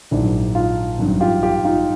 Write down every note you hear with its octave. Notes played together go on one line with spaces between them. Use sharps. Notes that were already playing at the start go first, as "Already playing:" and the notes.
A#1 G#2 D#3 F#3 D4 E4
D#4 F4
A1 G2 D#3 F#3
F4 G4
F4 G4
D#4 F4